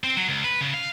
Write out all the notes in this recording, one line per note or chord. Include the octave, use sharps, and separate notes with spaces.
C4
F#3
C#2
B4
C#3
F5